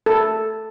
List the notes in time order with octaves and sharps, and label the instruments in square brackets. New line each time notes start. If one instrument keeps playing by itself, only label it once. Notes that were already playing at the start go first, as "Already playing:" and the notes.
[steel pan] A4